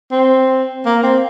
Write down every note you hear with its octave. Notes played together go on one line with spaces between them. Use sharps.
C4
A#3
C4